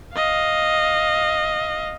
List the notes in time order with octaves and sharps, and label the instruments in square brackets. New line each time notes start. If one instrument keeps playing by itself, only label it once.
[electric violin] D#5 F5